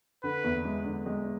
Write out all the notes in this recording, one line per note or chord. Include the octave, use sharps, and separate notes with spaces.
D3 B4
E2
G#3
D3
G#3